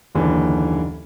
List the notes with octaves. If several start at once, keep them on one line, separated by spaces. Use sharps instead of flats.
F#1 D#2 D3 E3